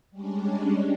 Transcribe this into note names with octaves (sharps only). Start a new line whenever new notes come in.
G3 G#3 C#4 D4